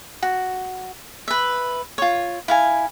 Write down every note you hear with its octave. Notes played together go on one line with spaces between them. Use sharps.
F#4
B4 E5
F4 C#5
E4 F5 G#5